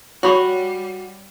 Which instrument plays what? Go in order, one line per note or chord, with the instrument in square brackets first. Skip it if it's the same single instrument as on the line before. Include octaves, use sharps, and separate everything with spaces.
[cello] G3 [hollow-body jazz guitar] F#4 [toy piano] C#5 B5 C#6